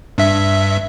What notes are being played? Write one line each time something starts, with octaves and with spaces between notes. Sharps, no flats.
G2 E5